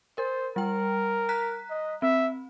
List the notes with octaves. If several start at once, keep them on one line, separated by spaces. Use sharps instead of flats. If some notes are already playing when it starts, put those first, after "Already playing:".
A#4 C5
G3 A#4 G5
A#5 F#6 B6
D#5
C4 E5